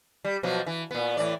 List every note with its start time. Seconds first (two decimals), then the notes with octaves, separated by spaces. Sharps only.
0.25 G3
0.43 B2 F3 F#3
0.66 E3
0.91 A#2 B3
1.17 A2 E3 D5